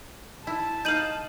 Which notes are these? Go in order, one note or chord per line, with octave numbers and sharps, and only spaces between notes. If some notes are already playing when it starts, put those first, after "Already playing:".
E4 A5
D#4 F5 G6 D#7 F#7